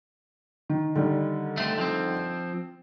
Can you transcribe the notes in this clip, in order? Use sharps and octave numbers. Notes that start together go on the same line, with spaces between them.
D#3
D3 D#3 G3
A3 C4
F3 C4